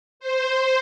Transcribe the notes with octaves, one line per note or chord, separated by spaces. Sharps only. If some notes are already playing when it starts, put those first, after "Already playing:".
C5